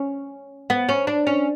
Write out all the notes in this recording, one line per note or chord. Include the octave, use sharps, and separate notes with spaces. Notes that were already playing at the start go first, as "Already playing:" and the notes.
Already playing: C#4
B3
C#4
D4
C#4